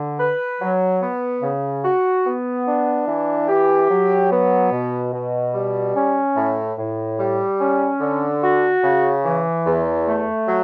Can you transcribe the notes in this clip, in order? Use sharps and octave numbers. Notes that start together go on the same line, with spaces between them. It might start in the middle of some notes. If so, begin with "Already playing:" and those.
Already playing: D3
B4
F#3
B3
C#3
F#4
B3
D4
E3
G4
F#3
B3
B2
B2
G3
C#4
A2
A2
G3
C#4
D3
F#4
C#3
E3
E2
A3
F#3